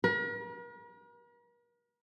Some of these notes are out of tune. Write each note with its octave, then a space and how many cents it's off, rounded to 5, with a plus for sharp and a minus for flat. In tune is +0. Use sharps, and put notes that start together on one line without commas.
A#4 +45